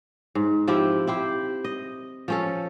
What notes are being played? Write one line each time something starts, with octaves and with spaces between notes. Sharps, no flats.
G#2
F3 C4 E4 G4
E4 G4 C5
D#5
F3 C#4 A4